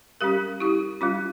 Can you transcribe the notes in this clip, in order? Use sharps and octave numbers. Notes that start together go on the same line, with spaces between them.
G3 C#4 G4 A#4
E4 G4
G3 C#4 F4